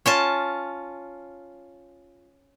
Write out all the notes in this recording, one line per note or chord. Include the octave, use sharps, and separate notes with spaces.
C#4 F4 A5